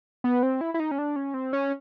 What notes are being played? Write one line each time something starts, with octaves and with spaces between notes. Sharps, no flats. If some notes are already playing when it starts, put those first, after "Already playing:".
B3
C4
E4
E4
D#4
C#4
D4
C#4
C4
C#4